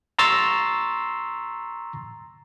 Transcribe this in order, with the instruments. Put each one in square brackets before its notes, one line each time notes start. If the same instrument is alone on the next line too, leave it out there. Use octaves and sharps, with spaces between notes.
[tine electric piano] A#5 C6 C#6 E6 A6 C7